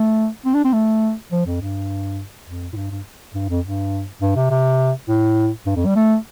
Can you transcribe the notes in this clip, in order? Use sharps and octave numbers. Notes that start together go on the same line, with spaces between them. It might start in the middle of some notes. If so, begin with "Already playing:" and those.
Already playing: A3
C4
D4
C4
A3
F3
F2
G2
F2
A2
G2
G2
G2
F2
G2
G2
C3
C3
A2
G2
F2
G3
A3